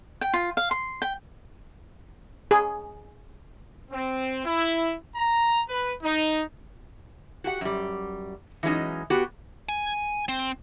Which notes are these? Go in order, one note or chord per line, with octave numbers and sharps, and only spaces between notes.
G5
F4
F5
C6
G5
G#4
C4
E4
A#5
B4
D#4
F#4 G4 F#5
F#2 G3
E3 F#3 G#3 C#4 D#4
B3 F#4 G4
G#5
C4